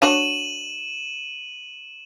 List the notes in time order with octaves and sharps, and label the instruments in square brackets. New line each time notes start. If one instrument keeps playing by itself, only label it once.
[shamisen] D4 F#4 C#5 [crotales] D#7 E7 F#7